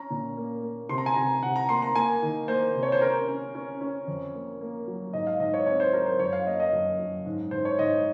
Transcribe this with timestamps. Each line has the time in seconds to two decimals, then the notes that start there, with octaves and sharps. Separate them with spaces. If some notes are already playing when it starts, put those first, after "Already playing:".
Already playing: C#4 A#5
0.10 A#2
0.37 A#3
0.63 A#3
0.89 C3 C6
0.98 A#5
1.06 G#5
1.14 C3 A#5
1.42 C3 F#5
1.56 A#5
1.69 A#3 C6
1.82 A#5
1.95 A#3 G#5
2.22 D#3
2.48 A#3 C5
2.75 C3
2.83 C#5
2.92 C5
3.01 C#4 A#4
3.28 C#4
3.55 C#4
3.81 C#4
4.07 F2
4.34 A#3
4.61 A#3
4.87 F#3
5.13 G#2 D#5
5.27 F5
5.40 G#2 D#5
5.54 C#5
5.67 C4 C#5
5.80 C5
5.93 F#3 A#4
6.06 C5
6.19 F#2 C#5
6.33 F5
6.46 A#3 D#5
6.60 D#5
6.73 F#2
6.99 F#2
7.26 G#2
7.51 G#2 C5
7.65 C#5
7.79 G#2 D#5